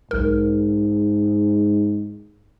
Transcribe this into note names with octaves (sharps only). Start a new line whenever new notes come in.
B1 G#2 A#4